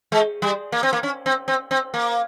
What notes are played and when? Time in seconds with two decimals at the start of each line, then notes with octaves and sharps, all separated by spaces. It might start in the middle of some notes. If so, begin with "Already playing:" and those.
0.12 G#3
0.42 G3
0.72 A#3
0.83 C4
0.93 A#3
1.03 C#4
1.26 C4
1.48 C4
1.71 C4
1.94 A#3